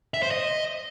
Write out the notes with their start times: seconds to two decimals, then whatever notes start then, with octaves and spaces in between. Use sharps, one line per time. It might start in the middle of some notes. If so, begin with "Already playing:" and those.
0.14 E5
0.23 C5
0.31 D#5